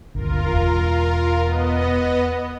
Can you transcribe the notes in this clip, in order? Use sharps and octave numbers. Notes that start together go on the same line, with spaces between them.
D1 G1 F4 A#4
E1
B3 D#5